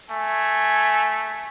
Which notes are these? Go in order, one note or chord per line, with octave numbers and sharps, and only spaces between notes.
A3 G#5